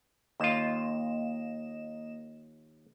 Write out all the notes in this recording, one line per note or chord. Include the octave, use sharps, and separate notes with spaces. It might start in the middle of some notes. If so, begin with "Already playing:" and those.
D#2 A#3 F4 D#5 E7